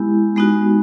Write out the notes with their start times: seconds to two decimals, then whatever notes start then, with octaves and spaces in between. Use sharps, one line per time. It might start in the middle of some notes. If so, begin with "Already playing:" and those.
Already playing: G#3 B3 E4 G4
0.36 G#3 B3 D#4 F#4